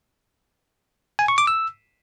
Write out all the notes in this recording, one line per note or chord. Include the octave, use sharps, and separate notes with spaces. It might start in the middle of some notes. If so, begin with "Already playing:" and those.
G#5
C#6
D6
E6